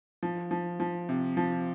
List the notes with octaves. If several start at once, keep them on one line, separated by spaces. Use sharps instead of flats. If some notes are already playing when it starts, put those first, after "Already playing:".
F3
F3
F3
C3
F3